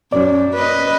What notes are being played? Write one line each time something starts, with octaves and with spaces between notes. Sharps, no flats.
F#2 C#4 D5
B4 D#5